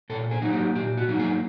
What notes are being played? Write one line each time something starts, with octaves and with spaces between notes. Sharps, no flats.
A#2 A4
G#4
F#3 A#3 D#4
G4
A#2 G4
F#4
F#3 A#3 D#4
G#4